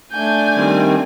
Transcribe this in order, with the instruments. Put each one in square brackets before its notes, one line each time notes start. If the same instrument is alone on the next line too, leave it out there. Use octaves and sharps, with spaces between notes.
[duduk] A3 [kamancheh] D4 G#5 [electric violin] G6
[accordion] D#3 G3 [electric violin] C4